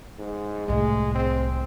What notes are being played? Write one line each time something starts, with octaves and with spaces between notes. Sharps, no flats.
G#2
C2 A2 G#3
C4